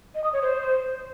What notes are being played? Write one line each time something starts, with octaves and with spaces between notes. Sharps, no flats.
D#5
D#6
C#5
C5